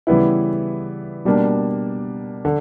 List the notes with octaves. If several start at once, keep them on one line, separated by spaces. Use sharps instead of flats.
C#3 E3 G3 B3 E4
B2 G3 A#3 D4
D3